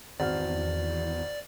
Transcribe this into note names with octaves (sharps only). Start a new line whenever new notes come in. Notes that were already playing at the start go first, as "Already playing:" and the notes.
G#1 E2 F#4 D5 F6